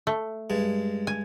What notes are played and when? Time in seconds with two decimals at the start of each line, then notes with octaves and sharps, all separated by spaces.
0.07 A3
0.50 G2 G#3
1.07 G#5